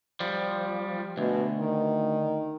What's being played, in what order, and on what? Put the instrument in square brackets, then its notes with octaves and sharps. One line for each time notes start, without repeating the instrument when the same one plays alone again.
[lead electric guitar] F3 G3
[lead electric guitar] D2 [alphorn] B2
[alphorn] D#3